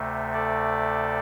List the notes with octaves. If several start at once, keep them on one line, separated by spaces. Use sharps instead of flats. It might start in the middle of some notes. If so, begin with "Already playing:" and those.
Already playing: D2 C3 A3
A4 D5